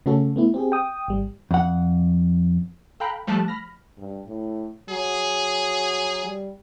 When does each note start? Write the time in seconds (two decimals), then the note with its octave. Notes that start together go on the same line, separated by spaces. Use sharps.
0.06 C#3 A3 C#4 F#4 A4
0.36 A3 B3 E4
0.54 C4 G4 G#4
0.72 G5 D#6
1.08 G#1 G3
1.51 F2 F#5
3.00 A4 F5 G5 A#5 B5 F#6
3.27 F3 G3 A3 A5 F#6
3.48 B5 F6 A#6
3.97 G2
4.25 A2
4.90 F#3 G#4
6.26 G3